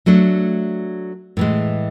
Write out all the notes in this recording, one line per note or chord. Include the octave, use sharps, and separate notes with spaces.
F#3 A3 D4
A2 E3 G#3